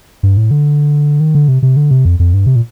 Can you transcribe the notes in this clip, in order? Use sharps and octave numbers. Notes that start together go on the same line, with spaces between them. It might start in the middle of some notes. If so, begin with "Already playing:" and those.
G2
A2
D3
D#3
D3
C3
C3
D3
C3
F2
F2
G2
C3
A#2